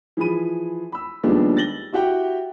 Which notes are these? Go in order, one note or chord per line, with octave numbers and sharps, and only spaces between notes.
E3 F3 G#4 B5 D#7
B5 E6
D#2 F3 G3 G#3 B3 D4
A6 A#6 F#7 G7
E4 F#4 G4 F#5 G5